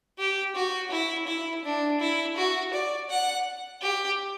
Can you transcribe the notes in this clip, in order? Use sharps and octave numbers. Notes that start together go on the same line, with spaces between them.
G4
F#4
E4
E4
D4
E4
F#4
D5
F#5
G4